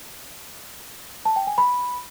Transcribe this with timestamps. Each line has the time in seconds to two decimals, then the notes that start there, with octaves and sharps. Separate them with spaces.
1.25 A5
1.36 G5
1.47 G#5
1.58 B5